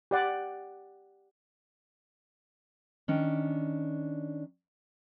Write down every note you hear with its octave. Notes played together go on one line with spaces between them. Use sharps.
G4 D5 F#5
D#3 C#4 D4